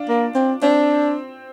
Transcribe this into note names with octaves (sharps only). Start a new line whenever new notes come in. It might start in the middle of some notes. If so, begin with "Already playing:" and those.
Already playing: D4 F4
A#3
C4
C4 D4